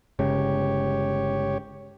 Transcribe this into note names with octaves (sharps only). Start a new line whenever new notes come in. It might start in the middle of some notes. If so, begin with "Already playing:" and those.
G1 C#3 G#3 G4 C#5